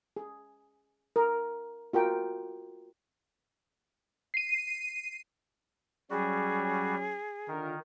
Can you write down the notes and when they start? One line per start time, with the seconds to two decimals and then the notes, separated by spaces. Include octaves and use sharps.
0.17 G#4
1.16 A#4
1.93 F4 F#4 A#4 G5
4.34 C7 D#7
6.11 F#3 G3 C#4 F#4 G#4
7.48 D3 D#3 F4 A#4